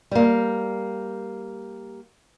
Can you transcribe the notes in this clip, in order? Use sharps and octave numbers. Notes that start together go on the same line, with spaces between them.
G3 A#3